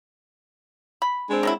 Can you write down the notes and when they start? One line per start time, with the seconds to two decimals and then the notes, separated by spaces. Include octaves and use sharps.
1.02 B5
1.30 G#3 C4 D4
1.43 D#3 F#3 E4